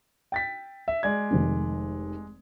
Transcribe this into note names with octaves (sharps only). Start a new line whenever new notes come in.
G5 A6 B6
E5
G#3 D5 G#6
F1 D#3